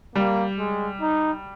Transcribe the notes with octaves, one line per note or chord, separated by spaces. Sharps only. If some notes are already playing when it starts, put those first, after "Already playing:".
G3 A#3
G#3
D#4